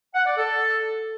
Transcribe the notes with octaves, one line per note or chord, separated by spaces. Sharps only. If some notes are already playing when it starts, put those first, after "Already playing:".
F#5
D5
A4